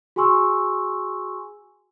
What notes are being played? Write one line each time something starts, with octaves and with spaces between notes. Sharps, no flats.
F#4 G#4 G#5 C6 C#6 E6